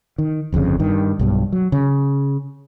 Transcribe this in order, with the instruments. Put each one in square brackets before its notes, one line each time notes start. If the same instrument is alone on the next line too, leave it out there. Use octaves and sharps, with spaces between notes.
[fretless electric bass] D#3
G1 F2 A2 C#3
G2 D#3
B1 G2 B2
F#3
C#3